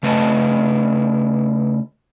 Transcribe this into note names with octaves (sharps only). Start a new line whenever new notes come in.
C#3 A3 B4 D#5 A5